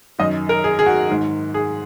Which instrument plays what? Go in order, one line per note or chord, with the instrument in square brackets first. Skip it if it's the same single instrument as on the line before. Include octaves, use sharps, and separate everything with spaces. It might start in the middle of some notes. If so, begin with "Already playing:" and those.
[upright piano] F#2 D#3 D#5
A#4
G#4
G#4
F#4
G#2 D#3
G#4